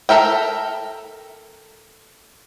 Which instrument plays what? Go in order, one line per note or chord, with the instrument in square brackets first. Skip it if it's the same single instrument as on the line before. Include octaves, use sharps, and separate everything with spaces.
[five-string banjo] A4 A#4 E5 G5